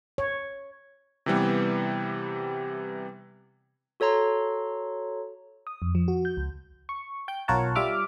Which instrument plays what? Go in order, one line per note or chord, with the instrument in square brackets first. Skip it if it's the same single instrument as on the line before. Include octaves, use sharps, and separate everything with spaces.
[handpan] C#5
[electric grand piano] C3 E3 G3 B3
[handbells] F#4 A4 C#5 A#5 C6
[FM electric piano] D#6
F2
F3
F#4
G6
C#2
C#6
G5 G6
B1 F4 A#4 C#5 F#5 A5
G3 F4 E5 D6 F6